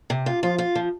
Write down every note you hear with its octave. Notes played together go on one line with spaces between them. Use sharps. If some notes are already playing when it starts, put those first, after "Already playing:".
C3
F4
F3 F4
F4
F3